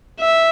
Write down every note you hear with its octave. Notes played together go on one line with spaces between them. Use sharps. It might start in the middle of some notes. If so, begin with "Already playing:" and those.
E5